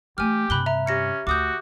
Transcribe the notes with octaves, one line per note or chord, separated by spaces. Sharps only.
E3 A3 G4 G#5 F6
G2 C3 B5 F#6 G7
E5 A#5
C#4 G4 A#6 C#7
D2 F#4 D6 D#6 G6